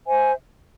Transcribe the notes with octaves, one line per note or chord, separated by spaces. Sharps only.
C5 E5 G#5